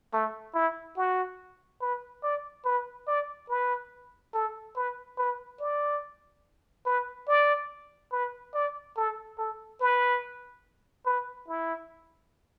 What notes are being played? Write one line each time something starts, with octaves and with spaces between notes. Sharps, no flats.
A3
E4
F#4
B4
D5
B4
D5
B4
A4
B4
B4
D5
B4
D5
B4
D5
A4
A4
B4
B4
E4